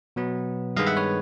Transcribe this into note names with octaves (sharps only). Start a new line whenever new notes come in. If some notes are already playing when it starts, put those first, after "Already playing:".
B2 F#3 B3
G2 D#3 G#3 B3 D#5 F5
E5 F#5
B4 C#5